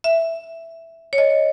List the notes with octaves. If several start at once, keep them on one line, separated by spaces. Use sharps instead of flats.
E5
C#5
D#5